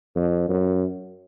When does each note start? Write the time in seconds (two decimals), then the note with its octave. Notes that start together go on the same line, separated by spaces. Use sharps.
0.16 F2
0.49 F#2